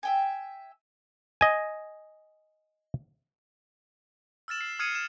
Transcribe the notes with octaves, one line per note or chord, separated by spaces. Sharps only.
E5 G5 G#5
D#5 G#5
E6 F6 A6 E7
C7
D#6 F6 G#6 C7 C#7 D#7
F6 E7